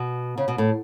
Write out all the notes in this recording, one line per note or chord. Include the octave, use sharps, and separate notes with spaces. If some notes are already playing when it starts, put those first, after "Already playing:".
Already playing: B2
C#3
B2
A2